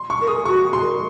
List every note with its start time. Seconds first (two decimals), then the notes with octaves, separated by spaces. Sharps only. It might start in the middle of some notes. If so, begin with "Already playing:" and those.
Already playing: C6
0.10 C#6
0.21 A#4
0.27 G#4 D#6
0.45 F#4 C#6
0.64 G#4
0.73 C6
0.82 A#4